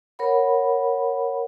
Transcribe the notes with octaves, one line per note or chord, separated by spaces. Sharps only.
A#4 C#5 F#5 B5